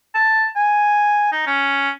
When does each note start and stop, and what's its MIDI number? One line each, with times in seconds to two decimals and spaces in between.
0.15 0.47 81
0.56 1.32 80
1.32 1.46 63
1.47 1.90 61